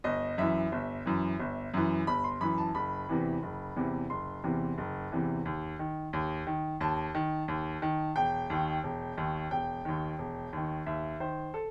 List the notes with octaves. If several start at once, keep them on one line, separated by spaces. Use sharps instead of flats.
G1 D#5
F#2 E3 E5
G1
F#2 E3
G1
F#2 E3
G1 B5
C6
F#2 E3 B5
A5
F#1 B5
E2 C3 E3
F#1
E2 C3 E3
F#1 C6
E2 C3 E3
F#1
E2 C3 E3
D#2
D#3
D#2
D#3
D#2 A5
D#3
D#2
D#3
E1 G5
D#2 D#3
E1
D#2 D#3
E1 G5
D#2 D#3
E1
D#2 D#3
D#2 E5
D#3 C5
A4